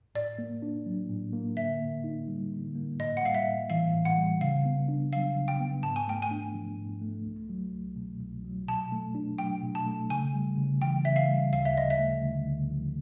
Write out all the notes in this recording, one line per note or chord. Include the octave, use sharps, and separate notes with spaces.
A2 D5
A#3
D4
F#3
A2
A#3
D3 E5
A#3
D#4
G3
D3
A#3
A2 D#5
F#5
G3 F5
E5
A2
E3 F5
A2
F#5
G3
C#3 F5
B3
D4
F#3 F5
C#3
G5
B3
G#2 A5
G#5
A3 G5
G#5
D4
F3
G#2
A3
C2
F#3
C2
B2
C2
F#3
B2 A5
A3
D4
F#3 G5
B2
A5
A3
C#3 G#5
G3
C#3
E3 G5
C#3 E5
F5
G3
D2 F5
E5
F3 D#5
E5
A3
D3
D2
F3